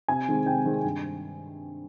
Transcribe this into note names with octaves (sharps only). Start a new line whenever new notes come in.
C3 G#5
D#3 G#3 C4
C3 G5
D#3 G#3 C4
G2